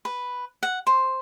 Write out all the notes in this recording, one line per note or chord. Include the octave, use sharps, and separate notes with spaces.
B4
F#5
C5